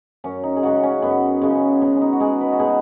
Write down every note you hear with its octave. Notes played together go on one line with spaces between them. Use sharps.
F#2 C#4
D#4
G#4
C#3 G#3 F#4
C#4
F#2 B3
C#3 G#3 C#4
B2 C#4
C#4
D#4
F#4
G#3 G#4
B4
F#4
B2 G#4